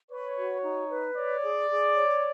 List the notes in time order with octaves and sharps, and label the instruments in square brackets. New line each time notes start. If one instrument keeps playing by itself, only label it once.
[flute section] B4 [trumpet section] C#5
[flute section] F#4
D#4
B4
[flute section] C#5 [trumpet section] D5
[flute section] G#4
G#4
C#5